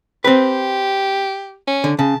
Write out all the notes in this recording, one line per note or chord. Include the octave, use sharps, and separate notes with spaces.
C4 G4 B4
C#4
D3
C#3 A5